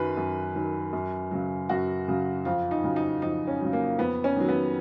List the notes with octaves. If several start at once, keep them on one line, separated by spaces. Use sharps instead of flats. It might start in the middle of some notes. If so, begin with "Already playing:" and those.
Already playing: F#2 D#3 F#3 B4
F#2
D#3 F#3
F#2
C#3 F#3
F#2 F#4
C#3 F#3
F2 F4
D#4
C#3 F#3
D#4
F2 D#4
C#4
C#3 F#3
A#3
F2 B3
C#4
D#3 F#3
B3